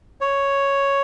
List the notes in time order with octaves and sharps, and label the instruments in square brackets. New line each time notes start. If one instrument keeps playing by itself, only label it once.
[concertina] C#5